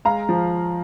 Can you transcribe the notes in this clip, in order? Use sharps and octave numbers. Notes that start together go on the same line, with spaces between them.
G#3 F5 A#5
F3